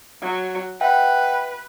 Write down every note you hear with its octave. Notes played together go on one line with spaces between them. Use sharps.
F#3
B4 E5 F#5 G5